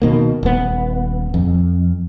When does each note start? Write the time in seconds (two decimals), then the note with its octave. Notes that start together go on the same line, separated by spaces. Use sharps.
0.02 B2 D#3 A#3
0.43 D#1 B3
1.34 F2